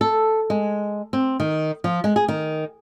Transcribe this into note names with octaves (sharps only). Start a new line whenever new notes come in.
A4
G#3
C4
D#3
F3
G#3
G#4
D#3